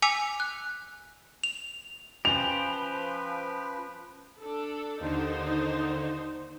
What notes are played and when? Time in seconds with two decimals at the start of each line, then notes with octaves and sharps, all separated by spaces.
0.02 G#5 D6 E6 B6 C#7 F7
0.40 F#6
1.44 F7
2.25 F3 C#4 G4 B4 C5 G#5 F7
4.41 D4 A4
5.00 D#2 D3 D#4 C5